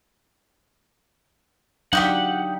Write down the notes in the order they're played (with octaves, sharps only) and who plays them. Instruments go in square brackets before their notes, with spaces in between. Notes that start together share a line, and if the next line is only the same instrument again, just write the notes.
[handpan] F#3 D4 F5 [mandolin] D#4 F#4 G4 [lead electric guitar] F#5